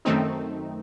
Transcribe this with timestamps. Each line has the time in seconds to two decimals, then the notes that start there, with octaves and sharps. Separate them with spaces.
0.05 F#2 D#3 A3 C4 D#4